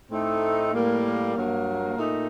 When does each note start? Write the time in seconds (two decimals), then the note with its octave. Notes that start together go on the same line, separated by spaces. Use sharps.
0.10 A2 A3 C4 D#4
0.72 A2 G3 A#3
1.34 G2 F#3 A#3
1.96 A#2 A3 D#4